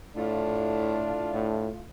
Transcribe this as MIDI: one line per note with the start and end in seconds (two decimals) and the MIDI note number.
0.16 1.26 45
0.16 1.82 57
0.16 1.66 62
0.16 1.82 64
0.16 1.82 65
1.33 1.70 45